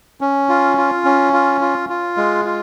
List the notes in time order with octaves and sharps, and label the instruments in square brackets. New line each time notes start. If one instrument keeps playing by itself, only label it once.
[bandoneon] C#4
F4
F4
C#4
F4
F4
F4
G#3
F4